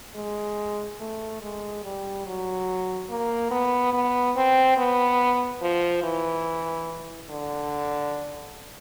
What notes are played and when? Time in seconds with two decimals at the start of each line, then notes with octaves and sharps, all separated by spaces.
0.15 G#3
1.00 A3
1.42 G#3
1.84 G3
2.26 F#3
3.10 A#3
3.51 B3
3.93 B3
4.36 C4
4.77 B3
5.61 F3
6.03 E3
7.30 D3